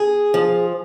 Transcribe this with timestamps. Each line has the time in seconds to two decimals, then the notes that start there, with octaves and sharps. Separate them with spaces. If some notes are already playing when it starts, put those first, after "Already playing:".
Already playing: G#4
0.34 F3